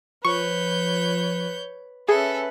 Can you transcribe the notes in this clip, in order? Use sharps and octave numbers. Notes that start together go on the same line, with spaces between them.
F3 B4 C#5 C#6 G6
C#4 G#4 A4 B4 E5